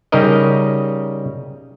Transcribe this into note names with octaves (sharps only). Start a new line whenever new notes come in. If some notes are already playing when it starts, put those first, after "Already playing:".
C#3 G3 D#4 A#4 D#5